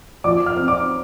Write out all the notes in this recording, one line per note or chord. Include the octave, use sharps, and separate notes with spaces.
F3 D5 D6
F5 F6
C4
D5 D6